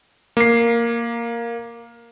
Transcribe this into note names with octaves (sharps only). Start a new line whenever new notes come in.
A#3 C7